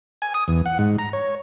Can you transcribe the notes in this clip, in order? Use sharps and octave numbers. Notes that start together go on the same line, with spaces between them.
G#5
D#6
E2
F#5
G#2
A#5
C#5